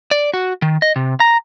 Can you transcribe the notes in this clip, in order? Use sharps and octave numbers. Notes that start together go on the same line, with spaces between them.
D5
F#4
D#3
D#5
C3
A#5